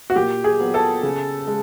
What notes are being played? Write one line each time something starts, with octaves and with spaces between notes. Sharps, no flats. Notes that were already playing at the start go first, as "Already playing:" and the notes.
F#4
A#2 G4
G#4
F#3 B3
A4
C#3
G#3